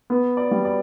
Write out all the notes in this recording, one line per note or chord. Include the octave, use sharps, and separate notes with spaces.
B3
D5
G3
D5